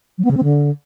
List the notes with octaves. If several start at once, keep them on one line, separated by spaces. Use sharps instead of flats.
F#3
B3
C#3
C4
D3